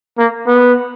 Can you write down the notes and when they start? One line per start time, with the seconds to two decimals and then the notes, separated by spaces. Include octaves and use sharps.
0.18 A#3
0.46 B3